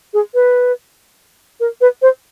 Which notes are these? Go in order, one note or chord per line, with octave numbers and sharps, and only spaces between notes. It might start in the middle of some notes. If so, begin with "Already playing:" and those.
G#4
B4
A#4
B4
C5